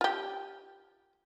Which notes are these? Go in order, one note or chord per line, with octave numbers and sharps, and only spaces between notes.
F4 G4